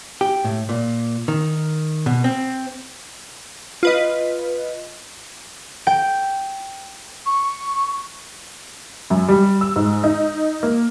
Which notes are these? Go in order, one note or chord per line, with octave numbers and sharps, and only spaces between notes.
G4
A2
A#2
D#3
B2
C4
F4 B4 D#5
G5
C#6
F#2
G3
E6
G#2
D#4
A#3